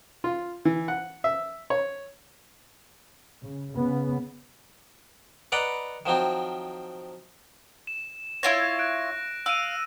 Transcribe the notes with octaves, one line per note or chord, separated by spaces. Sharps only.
F4
E3
F#5
E5
C#5
C#3
C#3 B3
B4 D5 D#5 F#5 A#5 B5
D#3 F3 F#3 C4
E7
E4 F4 C#5 A#6
F#6 D7
F5 E6 D7 D#7